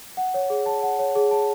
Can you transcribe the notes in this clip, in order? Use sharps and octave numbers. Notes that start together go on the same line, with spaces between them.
F#5
C#5
G#4
A5
F#5
C#5
G#4
A5